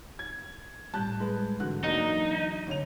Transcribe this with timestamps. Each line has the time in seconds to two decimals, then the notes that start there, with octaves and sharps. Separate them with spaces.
0.19 G#6
0.94 A2 G3 A5 F#6 G6
1.20 G#3 B4
1.60 G#2 D3 E3 F#4 F#6
1.84 D3 E3 F#3 A#3 D4 D#4
2.67 G1 C2 D#3 C#5 F7